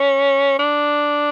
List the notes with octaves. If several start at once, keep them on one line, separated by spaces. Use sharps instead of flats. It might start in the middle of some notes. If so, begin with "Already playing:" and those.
Already playing: C#4
D4